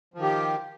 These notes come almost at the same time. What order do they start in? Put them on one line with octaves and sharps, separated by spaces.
F3 D#3 G4